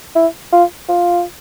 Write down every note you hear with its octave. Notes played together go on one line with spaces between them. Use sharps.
E4
F4
F4